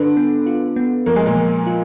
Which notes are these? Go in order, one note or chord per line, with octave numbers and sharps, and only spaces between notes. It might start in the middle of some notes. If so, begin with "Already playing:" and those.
Already playing: D3 D4 B4
B3
F4
B3
F3 A#3
G#3
A#2 A#3
F3
F4